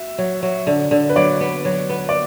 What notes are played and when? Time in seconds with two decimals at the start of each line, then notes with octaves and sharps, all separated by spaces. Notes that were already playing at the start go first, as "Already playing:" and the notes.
Already playing: F#4 E5
0.18 F#3
0.43 F#3
0.67 D3
0.91 D3
1.09 B4
1.16 F#3 D5
1.41 B3
1.65 F#3
1.90 B3
2.09 D5